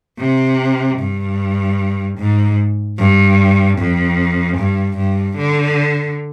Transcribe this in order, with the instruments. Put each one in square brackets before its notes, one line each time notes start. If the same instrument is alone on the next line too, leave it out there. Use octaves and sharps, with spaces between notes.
[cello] C3
G2
G#2
G2
F2
G2
G2
D3